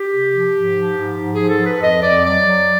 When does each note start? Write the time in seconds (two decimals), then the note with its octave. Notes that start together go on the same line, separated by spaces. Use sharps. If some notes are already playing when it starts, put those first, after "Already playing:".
Already playing: G4
0.11 C3
0.31 F3
0.54 G#2
0.75 F3
0.96 G#2
1.17 G#2
1.34 F3 G#4
1.48 A4
1.60 F3 B4
1.81 F2 D#5
2.02 F2 D5
2.24 F#3 D5
2.45 F#3